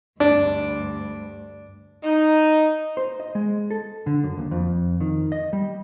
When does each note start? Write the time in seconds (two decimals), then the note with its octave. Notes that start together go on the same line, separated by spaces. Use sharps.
0.20 D2 G2 D4
2.03 D#4
2.97 C5
3.20 D#5
3.35 G#3
3.71 A4
4.07 D3
4.24 F#2
4.38 D#2
4.51 F2
5.01 D#3
5.32 D#5
5.53 G3